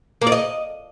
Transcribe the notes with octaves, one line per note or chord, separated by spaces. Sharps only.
A#3
D5
D#5